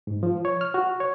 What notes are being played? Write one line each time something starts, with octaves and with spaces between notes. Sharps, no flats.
G#2
F3
C#5
F6
F#4
C#5